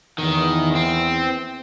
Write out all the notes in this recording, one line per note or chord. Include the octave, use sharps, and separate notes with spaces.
E2 D#3
C4